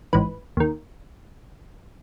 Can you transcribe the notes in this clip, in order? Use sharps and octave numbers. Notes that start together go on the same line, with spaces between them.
A1 G#2 E3 B4
D#2 D#3